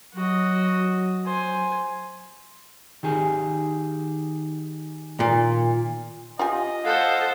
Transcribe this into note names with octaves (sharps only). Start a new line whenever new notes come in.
F#3 F#4 D#5
C5 G#5
D#3 G4 G#4
A#2
F4 G4 D#5 G#5
A4 C5 F5 F#5